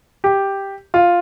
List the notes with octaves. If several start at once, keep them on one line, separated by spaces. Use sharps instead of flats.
G4
F4